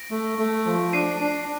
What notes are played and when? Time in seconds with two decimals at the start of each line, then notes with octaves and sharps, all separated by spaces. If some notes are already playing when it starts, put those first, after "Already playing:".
Already playing: A#6 D7
0.11 A3
0.38 A3
0.66 F3
0.93 D4 C7 D#7
1.20 D4